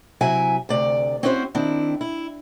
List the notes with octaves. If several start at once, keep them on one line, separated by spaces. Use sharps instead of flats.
C3 F#3 E4 E5 G#5
D2 C3 D5
C4 C#4 E4 F#4 B4 C5
D#3 C4 D4 E4
E4